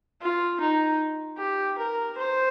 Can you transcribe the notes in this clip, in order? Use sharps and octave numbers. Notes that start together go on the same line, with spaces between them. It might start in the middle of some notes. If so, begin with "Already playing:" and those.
F4
D#4
G4
A#4
C5